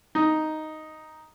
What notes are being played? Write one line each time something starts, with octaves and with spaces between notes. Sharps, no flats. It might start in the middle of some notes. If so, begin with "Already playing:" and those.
D#4